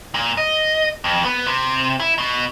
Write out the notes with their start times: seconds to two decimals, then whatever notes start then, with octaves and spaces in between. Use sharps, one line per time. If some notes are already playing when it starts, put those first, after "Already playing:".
0.14 A#2
0.37 D#5
1.04 F2
1.25 B3
1.47 C3
2.00 E4
2.18 B2